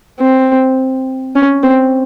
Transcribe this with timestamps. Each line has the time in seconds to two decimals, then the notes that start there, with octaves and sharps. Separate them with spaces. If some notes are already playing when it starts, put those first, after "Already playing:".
0.20 C4
1.35 C#4
1.63 C4